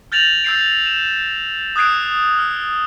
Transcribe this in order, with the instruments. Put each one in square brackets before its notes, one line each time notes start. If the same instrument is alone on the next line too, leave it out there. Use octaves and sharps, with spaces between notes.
[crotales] F6 G6 A6 A#6 F7 F#7
E6 G6 C7 D7
E7
D#6 F#6 G#6 C7 D7
F6